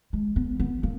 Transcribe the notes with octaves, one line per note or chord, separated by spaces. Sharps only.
G#3
B3
B3
A#3